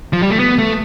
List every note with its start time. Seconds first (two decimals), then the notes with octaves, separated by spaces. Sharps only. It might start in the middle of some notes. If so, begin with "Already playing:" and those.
0.13 F3
0.22 G3
0.30 A3
0.39 B3
0.58 A3